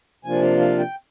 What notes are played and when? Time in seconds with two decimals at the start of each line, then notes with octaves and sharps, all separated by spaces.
0.24 C3 F3 A#3 D4 F4 G#5
0.42 F5
0.61 F5
0.79 G5